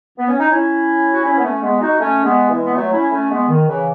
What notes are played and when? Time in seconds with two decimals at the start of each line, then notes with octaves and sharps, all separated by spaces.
0.18 B3
0.28 C#4
0.39 D#4
0.50 C#4 E4
1.13 F#4
1.24 C#4 E4
1.38 B3
1.43 A3 C#4
1.62 G#3 B3
1.80 D#4 F#4
1.99 A3 C#4
2.24 G#3 B3
2.49 E3 G#3
2.65 B3
2.74 F#3 A3
2.92 C#4 E4
3.11 A3 C#4
3.30 G#3 B3
3.48 D#3
3.67 C#3 E3